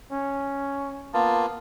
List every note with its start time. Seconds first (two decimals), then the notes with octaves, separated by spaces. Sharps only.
0.12 C#4
1.14 A#3 B3 F4 A5